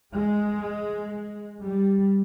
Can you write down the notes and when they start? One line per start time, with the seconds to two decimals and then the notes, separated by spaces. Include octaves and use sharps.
0.15 G#3
1.63 G3